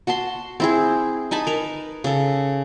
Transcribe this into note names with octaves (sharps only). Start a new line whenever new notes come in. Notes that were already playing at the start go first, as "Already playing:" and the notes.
F#4 F#5 A5 C6
C4 E4 G#4
D#4 G#5 A5 B5
A#4 B4
C#3 A4